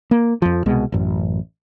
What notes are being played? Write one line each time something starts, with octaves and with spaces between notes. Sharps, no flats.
A#3
F2 F3
C2 B2 G#3
A1 F#2